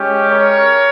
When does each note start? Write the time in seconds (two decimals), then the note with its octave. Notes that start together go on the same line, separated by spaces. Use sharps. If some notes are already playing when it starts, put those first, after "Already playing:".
Already playing: G#3 C#4 G4
0.28 A#4 C#5